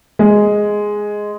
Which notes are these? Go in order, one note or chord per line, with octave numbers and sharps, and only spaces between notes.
G#3